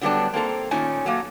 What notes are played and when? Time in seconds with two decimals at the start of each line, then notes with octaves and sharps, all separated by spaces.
0.01 D3 F#3 G3 A3 B3 D4
0.34 A#3 C4 A4 A#5
0.71 A#2 D#3 A3 C#4 G#5
1.06 F#3 A3 A#3